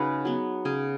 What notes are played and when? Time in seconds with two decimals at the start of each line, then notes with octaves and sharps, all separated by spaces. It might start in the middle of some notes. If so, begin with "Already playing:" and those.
Already playing: C#3 D#4 F#4 G#4 B4 C#5
0.25 F#3 B3
0.65 C#3 G#4